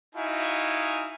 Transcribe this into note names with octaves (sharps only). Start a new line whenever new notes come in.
D#4 E4 F#4 F5 G#5